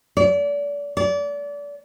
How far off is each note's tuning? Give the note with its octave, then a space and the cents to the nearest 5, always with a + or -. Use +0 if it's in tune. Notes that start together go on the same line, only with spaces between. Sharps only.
D5 -35
D5 -30